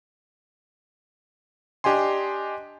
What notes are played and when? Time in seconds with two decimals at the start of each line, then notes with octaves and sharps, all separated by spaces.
1.84 D4 G4 D#5 G#5 C6